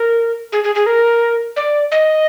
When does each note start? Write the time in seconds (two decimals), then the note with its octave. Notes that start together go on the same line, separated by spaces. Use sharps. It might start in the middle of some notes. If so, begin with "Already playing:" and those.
Already playing: A#4
0.52 G#4
0.64 G#4
0.75 G#4
0.86 A#4
1.56 D5
1.92 D#5